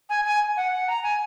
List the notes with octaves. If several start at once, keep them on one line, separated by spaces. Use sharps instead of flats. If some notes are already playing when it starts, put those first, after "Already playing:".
G#5
G#5
F#5
F#5
A#5
G#5